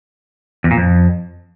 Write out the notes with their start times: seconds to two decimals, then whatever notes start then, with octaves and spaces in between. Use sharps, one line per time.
0.64 E2
0.71 A#2
0.77 F2